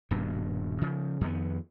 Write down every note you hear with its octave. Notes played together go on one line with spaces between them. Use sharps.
D#1 G2 B2
C#3 F3
F2 D#3 B3